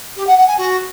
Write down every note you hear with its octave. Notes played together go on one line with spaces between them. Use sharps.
G4
F#5
F#5
G#5
F#4